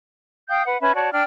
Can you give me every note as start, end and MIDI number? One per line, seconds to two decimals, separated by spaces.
0.49 0.63 77
0.49 0.63 79
0.49 0.63 87
0.49 0.63 91
0.65 0.80 71
0.65 0.80 78
0.80 0.94 61
0.80 0.94 71
0.80 0.94 76
0.80 0.94 83
0.95 1.12 66
0.95 1.12 73
0.95 1.12 74
0.95 1.12 81
1.12 1.24 62
1.12 1.24 74
1.12 1.24 79
1.12 1.24 89